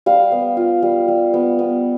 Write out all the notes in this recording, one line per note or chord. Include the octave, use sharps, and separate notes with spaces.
G3 F5
B3
F4
G3
G3
B3
B3